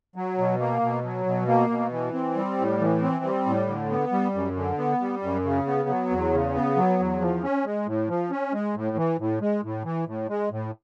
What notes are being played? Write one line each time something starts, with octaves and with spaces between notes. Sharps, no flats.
F#3
B2
A#3
B2
F#3
B2
A#3
B2
E3
C4
G3
A2
E3
C4
G3
A2
D3
B3
G3
F#2
D3
B3
G3
F#2
C#3
B3
F#3
E2
C#3
B3
F#3
E2
F3
C#4
G#3
A2
F3
C#4
G#3
A2
E3
A2
G#3
A2
E3
A2
G#3
A2